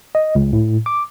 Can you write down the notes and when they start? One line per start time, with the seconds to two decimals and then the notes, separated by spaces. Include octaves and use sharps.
0.15 D#5
0.35 C#2
0.53 A2
0.86 D6